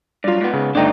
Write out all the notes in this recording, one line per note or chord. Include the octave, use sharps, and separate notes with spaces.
G2 F#3 F4 D5
G#2 B3
C#3
G1 A3 D4 D#4 G5